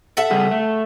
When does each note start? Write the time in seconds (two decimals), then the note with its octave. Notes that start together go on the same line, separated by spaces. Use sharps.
0.17 A4 E5 F#5
0.31 C#3 G3 G#4
0.51 A3